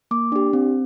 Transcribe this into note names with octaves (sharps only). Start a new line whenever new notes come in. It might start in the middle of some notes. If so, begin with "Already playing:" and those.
A#3 D6
D4 G4
C4